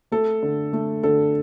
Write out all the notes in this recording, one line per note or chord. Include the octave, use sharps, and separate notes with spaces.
A3 A4
D3
A3
D3 A4